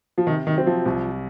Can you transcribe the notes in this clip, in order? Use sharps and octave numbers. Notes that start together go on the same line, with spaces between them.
F3
C3 D#3
D#3
F#3 C4
F3
C2